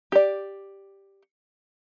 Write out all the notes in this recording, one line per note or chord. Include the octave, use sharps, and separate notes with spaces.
G4 D5